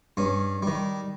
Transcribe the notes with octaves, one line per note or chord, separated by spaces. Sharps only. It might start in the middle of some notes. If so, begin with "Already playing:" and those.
G2 C#4
D#3 G3